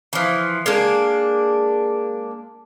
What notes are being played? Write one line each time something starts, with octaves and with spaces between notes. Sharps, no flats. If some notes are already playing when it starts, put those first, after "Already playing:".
E3 F3
G#3 A#3 D4